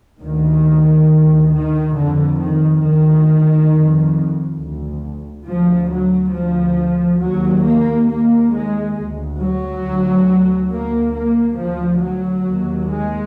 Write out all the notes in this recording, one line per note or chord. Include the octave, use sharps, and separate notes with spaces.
D2 D#3
D2
D#3
F2 D3
D#3
D2 D#3
F2
D2
D2 F3
F#3
D2 F3
D#2 F#3
A#3
D#2 A#3
G#3
D2
F#3
D2
D2 A#3
A#3
D2 F3
F#3
D#2
G#3